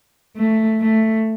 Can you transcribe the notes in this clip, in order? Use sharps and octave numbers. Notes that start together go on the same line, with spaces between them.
A3
A3